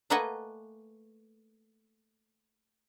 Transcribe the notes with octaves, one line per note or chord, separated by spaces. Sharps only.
A3 A#3 B4 D#5 F#5 G#5